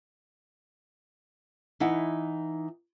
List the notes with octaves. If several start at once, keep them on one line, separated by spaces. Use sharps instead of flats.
E3 D#4 E4 F#5